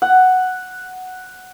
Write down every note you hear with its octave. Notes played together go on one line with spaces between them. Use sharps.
F#5